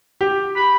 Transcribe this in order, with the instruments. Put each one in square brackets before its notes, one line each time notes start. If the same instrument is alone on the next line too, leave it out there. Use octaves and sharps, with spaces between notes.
[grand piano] G4
[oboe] B5